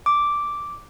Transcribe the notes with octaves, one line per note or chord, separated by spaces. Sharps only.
D6